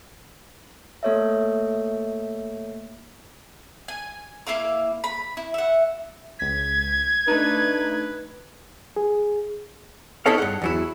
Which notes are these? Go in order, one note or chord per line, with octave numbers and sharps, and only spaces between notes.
A3 A#3 A4 C#5 D#5 E5
G#5
A#3 E4 F5 D6
B5
E4
E5 F#5
C#2 G#6 B6
A3 D4 D#4 B4
G#4
D#4 E4 G#4 A4 C#5 F5
G2 F#5
E2 F#3 E4